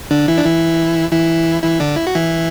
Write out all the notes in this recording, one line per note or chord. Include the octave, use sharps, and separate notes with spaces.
D3 D4
E3 E4
D4
E3 E4
E3 E4
E3 E4
D3 D4
E4
F#4
E3 E4